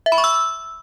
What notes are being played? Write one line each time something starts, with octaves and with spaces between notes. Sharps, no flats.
E5
B5
C#6
E6